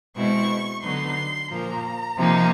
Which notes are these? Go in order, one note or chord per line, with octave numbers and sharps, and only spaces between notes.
B2 G#3 C4 E4 C#6
D3 F#3 B3 D#4 C6
A#2 F3 A#3 A#5
C3 F3 A#3 D#4